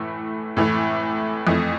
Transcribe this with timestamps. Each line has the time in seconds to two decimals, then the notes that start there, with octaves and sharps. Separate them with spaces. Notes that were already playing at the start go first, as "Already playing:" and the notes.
Already playing: A2 E3 A3
0.57 A2 E3 A3
1.47 F2 E3 A3